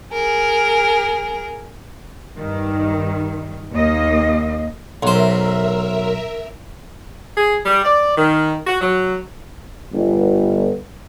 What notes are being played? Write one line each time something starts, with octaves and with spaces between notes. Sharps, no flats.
G#4 A#4
G2 D#3
D#2 A#3 D#5
B1 A#4 C5 E5
G#4
G3
D5
D#3
F#4
F#3
G1